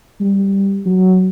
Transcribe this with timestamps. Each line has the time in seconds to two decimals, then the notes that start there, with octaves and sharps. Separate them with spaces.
0.20 G3
0.86 F#3